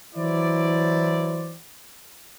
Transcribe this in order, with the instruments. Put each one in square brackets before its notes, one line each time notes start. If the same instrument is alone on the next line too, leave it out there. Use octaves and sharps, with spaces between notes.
[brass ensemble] E3 F#3 E4 C5 D5